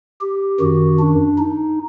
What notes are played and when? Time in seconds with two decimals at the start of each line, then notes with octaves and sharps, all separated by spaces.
0.21 G4
0.60 F#2 D#3 F#4
0.99 D4
1.38 D#4